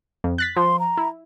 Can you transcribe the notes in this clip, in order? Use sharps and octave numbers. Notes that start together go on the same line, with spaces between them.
F2
F#6 A6 B6
F3 C6
A#5
E4